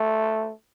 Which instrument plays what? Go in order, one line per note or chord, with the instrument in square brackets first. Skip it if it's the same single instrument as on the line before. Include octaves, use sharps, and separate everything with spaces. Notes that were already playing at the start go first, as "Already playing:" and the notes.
Already playing: [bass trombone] A3